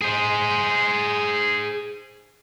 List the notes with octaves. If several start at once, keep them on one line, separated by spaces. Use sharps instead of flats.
G#4 C5